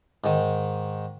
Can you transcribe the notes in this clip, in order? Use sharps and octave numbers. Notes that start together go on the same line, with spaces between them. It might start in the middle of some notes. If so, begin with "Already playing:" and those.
G#2 D#3